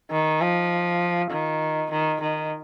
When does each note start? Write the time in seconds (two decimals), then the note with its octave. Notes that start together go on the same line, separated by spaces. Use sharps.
0.11 D#3
0.40 F3
1.31 D#3
1.91 D#3
2.21 D#3